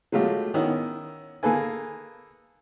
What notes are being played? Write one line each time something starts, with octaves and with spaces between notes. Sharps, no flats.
F#3 G#3 A3 F4 G4
D#3 B3 C#4 E4
A#3 G#4 A4 B4 G#5